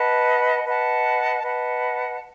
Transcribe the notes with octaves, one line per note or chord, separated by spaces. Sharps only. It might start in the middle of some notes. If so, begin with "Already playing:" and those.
Already playing: B4 D#5 F#5 A5
B4 D#5 F#5 A5
B4 D#5 F#5 A5